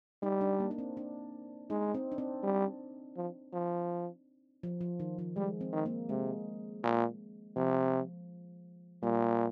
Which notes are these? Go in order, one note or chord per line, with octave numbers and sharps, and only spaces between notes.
G3 D#4
D4
A#3
D4
C4
D4
G#3 D#4
C4
D4
C4
G3
F3
F3
F3
F3
D#3
F3
G3 G#3
C4
D#3
A#3
C3 G#3
A#2
C3 F3
A#2 G3